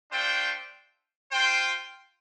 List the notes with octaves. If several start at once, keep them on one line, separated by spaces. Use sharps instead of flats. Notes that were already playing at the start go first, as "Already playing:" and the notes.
A3 D4 F4 C5 G5
F4 C5 G5